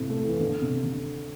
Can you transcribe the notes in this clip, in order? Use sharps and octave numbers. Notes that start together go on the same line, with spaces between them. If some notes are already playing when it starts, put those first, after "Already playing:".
Already playing: A2 C3
A3
E3
D3
C3
D3